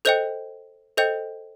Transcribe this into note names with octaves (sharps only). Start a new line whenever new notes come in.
A4 C5 D#5 G5 G6
A4 C5 D#5 G5 G6